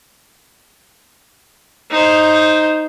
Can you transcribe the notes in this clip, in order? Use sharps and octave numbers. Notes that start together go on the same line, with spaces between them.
D#4 C5